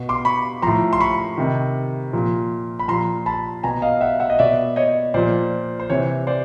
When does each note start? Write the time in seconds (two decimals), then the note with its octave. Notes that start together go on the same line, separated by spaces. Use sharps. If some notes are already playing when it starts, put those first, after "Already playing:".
Already playing: B2
0.09 C6 D6
0.25 B5 C#6
0.62 A2 F3 A#5 C6
0.93 C6
1.01 B5 C#6
1.38 C3 D#3
2.13 A#2 F3
2.79 B5
2.88 A#2 F3 A#5 C6
3.26 A5 B5
3.63 B2 G#5 A#5
3.82 D#5 F5
4.01 E5 F#5
4.20 E5 F#5
4.30 D#5
4.39 B2 D5 E5
4.76 C#5 D#5
5.14 A#2 F3 C5 D5
5.80 C5
5.89 C3 E3 C#5
6.27 C5 D5